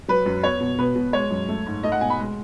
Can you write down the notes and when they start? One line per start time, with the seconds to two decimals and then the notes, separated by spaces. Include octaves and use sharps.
0.08 F#3 B4
0.26 F#2
0.43 B3 C#5
0.60 B2
0.78 B2 B4
0.96 B2
1.13 G#3 C#5
1.31 F#2
1.49 A3
1.66 G#2
1.83 A3 D#5
1.92 F#5
2.01 B2 G#5
2.10 B5
2.19 G#3